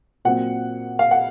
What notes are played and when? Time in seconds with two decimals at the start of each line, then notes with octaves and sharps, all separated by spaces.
0.25 A#2 F#3 C4 F#5
0.99 F5
1.11 F#5